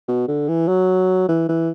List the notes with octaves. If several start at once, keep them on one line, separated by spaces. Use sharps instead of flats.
B2
D3
E3
F#3
E3
E3